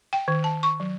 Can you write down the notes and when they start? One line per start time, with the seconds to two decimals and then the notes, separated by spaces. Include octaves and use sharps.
0.13 G5
0.28 D#3
0.44 A5
0.63 C#6
0.80 F#3